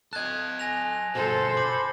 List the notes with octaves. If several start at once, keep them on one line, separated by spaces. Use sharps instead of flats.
A4 D#5 F#6 G#6
G#5 A#6 F7
G2 B2 A4 C5
B5 D6